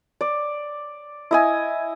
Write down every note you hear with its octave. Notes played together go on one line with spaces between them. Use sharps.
D5
E4 D#5 G#5